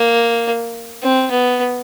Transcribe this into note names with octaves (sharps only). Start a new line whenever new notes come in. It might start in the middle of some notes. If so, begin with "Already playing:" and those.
Already playing: A#3
C4
B3